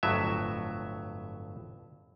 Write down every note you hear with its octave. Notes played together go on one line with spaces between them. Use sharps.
G1 F2 A2 F#3 E5